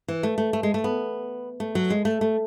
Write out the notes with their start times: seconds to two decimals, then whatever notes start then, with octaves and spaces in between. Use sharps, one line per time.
0.08 E3
0.23 A3
0.38 A3
0.53 A3
0.63 G#3
0.74 A3
0.84 B3
1.60 A3
1.75 F#3
1.90 G#3
2.05 A3
2.21 A3